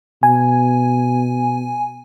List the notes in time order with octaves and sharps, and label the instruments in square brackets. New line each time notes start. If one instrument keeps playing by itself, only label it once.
[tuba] B2 [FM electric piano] G#5